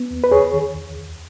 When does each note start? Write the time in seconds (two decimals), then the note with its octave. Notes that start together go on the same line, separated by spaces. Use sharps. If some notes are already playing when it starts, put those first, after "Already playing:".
Already playing: B3
0.10 D#2
0.24 B4
0.31 D#2 G#4 C#5
0.53 D#3
0.74 D#2
0.95 D#2